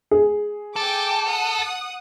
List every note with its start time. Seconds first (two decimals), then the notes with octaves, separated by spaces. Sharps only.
0.11 G#4
0.76 A4 G5 G#5 D6
1.26 F#5 D#6